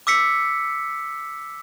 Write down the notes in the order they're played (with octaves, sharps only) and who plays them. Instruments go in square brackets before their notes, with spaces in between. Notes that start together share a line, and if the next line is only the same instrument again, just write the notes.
[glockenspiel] D6 E6 B6 C#7